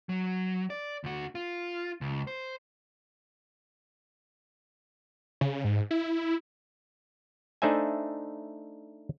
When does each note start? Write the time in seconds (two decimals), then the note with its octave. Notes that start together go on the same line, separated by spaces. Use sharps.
0.09 F#3
0.70 D5
1.04 D2 F#4
1.35 F4
2.01 C#2
2.27 C5
5.41 C#3
5.64 G#2
5.91 E4
7.62 A3 D4 D#4 C5 E5 G#5